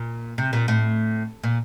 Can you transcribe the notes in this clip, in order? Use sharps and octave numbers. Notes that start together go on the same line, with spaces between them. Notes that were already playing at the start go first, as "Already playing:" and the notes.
Already playing: A#2
C3
A#2
A2
A#2